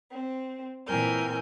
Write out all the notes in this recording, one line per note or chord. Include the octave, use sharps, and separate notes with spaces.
C4
A#2 E3 C4 A#4 G#5 G6